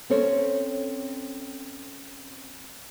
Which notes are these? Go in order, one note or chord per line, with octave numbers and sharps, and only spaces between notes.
C4 C#4 A4 C5 C#5